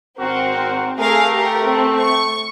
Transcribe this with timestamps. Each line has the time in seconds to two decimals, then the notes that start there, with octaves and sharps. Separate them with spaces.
0.18 G#1 C4 F#4 A#4
0.99 A3 G#4 A#4 F5
1.33 G4 A#4
1.65 C4
1.98 C#6